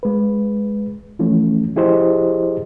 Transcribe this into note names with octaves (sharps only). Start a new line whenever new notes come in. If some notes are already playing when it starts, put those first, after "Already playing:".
G#3 B4
E3 F3 A3 C#4
F3 E4 G4 G#4 C5 D#5